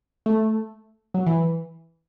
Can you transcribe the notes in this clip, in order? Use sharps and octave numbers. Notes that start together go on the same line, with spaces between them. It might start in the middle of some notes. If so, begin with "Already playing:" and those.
A3
F#3
E3